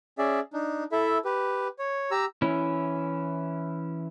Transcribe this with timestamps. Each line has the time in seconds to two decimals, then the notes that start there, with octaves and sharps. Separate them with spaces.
0.18 C#4 G#4 D5 E5
0.53 D4 D#4
0.92 E4 A4 E5
1.25 G4 B4
1.79 C#5
2.11 G4 A#5 E6
2.42 E3 C#4 E4